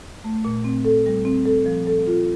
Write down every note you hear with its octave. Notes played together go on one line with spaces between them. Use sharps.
A3
A#2
C4
A4
G3
C4
A4
F3
A4
F4